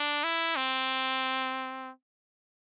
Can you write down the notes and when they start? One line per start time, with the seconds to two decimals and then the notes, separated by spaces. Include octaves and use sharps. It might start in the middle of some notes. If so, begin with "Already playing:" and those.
Already playing: D4
0.24 E4
0.56 C4